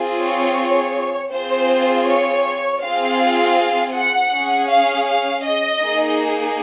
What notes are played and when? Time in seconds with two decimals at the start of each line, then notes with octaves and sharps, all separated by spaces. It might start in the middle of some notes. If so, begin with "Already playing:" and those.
Already playing: C4 F4 G#4
0.21 C#5
1.32 C4 F4 G#4 C5
2.07 C#5
2.82 C4 F4 G#4 F5
3.94 F#5
4.31 C#4 G#4
4.69 F5
5.06 F5
5.44 D#5
5.82 A#3 D#4 G#4